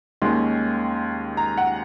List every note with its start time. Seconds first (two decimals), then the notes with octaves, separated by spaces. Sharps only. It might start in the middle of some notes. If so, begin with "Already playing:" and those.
0.22 D#2 D#3 G#3 C#4 C6
1.37 A#5
1.58 F#5